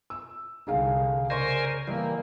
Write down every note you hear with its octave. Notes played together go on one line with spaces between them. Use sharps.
E6
C2 D3 D#4 G#4 F5
C#3 A#4 C5 D5 G#5 C6 C#6
E3 G3 A#3 D#5